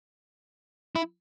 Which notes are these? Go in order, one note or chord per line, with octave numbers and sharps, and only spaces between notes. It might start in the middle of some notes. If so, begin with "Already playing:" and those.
E4